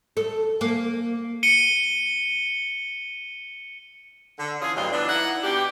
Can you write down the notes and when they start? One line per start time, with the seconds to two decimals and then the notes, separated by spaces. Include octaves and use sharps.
0.17 A4
0.61 A#3
1.43 C#7 D#7 G7
4.39 D3
4.61 E3 C#4 F4 G#4
4.75 D2 G2 B2 F#3 F4
4.92 E3 B3 D4
5.08 D#4 E4 F#5
5.44 B2 D4 G4